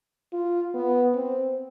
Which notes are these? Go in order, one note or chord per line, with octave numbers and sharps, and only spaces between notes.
F4
B3
C4